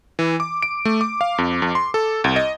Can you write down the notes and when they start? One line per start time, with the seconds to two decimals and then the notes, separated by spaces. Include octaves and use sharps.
0.19 E3
0.40 D6
0.62 D7
0.85 A3
1.01 D6
1.21 F5
1.38 F2
1.62 F2
1.75 C6
1.94 A4
2.24 C2
2.36 D#5